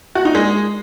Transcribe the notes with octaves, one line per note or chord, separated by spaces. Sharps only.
F#4
D#4
G#3